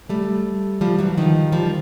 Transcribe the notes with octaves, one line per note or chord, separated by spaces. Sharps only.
G3 A3
F3 G3
E3 F#3
D#3 F3
F3 G3